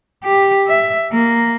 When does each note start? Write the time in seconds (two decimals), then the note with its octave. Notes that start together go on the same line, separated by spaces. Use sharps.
0.24 G4
0.68 E5
1.13 A#3